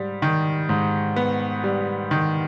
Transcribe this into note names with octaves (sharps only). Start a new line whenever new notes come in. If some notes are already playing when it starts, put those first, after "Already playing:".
Already playing: G#2 G3
D#3
G#2
B3
G3
D#3